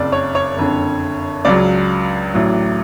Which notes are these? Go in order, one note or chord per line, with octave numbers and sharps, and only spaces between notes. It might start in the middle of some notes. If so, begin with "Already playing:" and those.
Already playing: F#1 F2 C#3 D5
C#5
C#5
F#1 F2 D3
C#2 C#3 F#3 D5
A1 A2 F#3